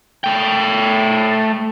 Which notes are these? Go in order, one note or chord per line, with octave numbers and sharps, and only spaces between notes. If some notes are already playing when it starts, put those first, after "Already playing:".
A3 G5